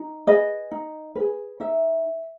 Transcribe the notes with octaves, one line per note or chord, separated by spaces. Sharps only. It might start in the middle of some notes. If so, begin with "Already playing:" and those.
Already playing: D#4
G#4 B4 D#5
D#4
G#4 B4
D#4 E5